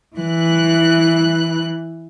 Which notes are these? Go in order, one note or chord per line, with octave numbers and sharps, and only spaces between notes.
E3 F#6